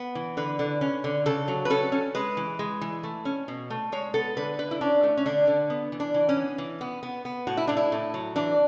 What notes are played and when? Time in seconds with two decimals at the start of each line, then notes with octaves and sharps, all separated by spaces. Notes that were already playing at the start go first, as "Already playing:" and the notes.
Already playing: B3
0.15 E3
0.37 D3 B4
0.59 D3
0.81 C#4
1.04 D3
1.26 C#3 A4
1.48 F#3
1.65 B4
1.70 C#4 A4
1.92 C#4
2.15 G#3 B4
2.37 E3
2.59 G#3
2.81 E3
3.03 A3
3.25 C#4
3.48 B2
3.70 A3
3.92 G#3 C#5
4.14 B3 A4
4.37 D3 B4
4.59 D3 B4
4.71 E4
4.81 C#4 D4
5.03 A3
5.17 C#4
5.26 D3 D4
5.47 D3
5.70 B3
5.92 E3
6.00 D4
6.14 E3
6.29 C#4
6.37 B3
6.58 E3
6.81 B3
7.03 B3
7.25 B3
7.47 A2 F#4
7.57 E4
7.67 A2 D4
7.77 E4
7.92 A2
8.14 F#3
8.36 E3 D4